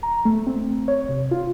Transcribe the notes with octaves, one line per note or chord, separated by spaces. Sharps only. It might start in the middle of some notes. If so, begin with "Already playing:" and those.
A#5
A3
C4
C#5
C3
F4